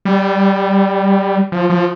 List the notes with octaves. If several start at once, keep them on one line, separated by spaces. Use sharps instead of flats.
G3
F3
F3